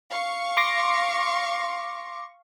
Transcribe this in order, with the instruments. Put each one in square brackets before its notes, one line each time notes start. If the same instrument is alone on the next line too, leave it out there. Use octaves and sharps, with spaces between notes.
[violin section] F5 C#6
[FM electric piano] C6 D6 A#6